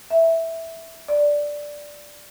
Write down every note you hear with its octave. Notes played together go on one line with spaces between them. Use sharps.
E5
D5